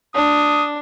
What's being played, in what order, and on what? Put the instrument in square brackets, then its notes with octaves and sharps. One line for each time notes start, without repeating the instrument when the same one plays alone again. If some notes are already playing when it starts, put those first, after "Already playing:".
[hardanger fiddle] D4 [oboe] D#6